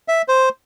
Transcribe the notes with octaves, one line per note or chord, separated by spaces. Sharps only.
E5
C5